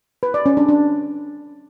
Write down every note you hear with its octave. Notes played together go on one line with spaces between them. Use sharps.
B4
D5
C#4
D4
D4